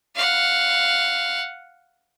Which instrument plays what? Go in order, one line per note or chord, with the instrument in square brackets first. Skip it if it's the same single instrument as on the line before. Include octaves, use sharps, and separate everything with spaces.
[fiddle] F5 F#5